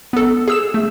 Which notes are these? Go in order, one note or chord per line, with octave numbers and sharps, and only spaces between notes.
B3 A4
G#4 E6 E7
A3